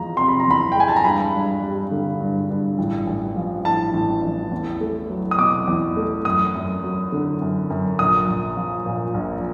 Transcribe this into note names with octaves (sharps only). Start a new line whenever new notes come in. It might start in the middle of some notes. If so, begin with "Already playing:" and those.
Already playing: E2 F3 G#3 A#5
C3 C6
B5
A#5
E2 B5
G5
G#3 G#5
A5
A#5
G2 B5
G2
G3
D3
G2
G2
A1
A1
F3
A2 A5
A1
A1
E2
A3
F#3
D#6
B2 D6
E2
A3
F#2 D#6
F#2
F#3
D3
F#2
F#2
A#1 D#6
A#1
F3
A#2
A#1